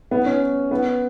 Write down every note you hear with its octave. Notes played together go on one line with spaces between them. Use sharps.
B3
C#4
B3